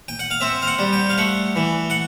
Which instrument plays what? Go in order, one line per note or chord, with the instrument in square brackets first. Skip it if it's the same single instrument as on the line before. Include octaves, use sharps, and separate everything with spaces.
[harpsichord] G5
F#5
F5
C4 E5
F5
F#5
G3
G5
F5
A3 F#5
E3
F#5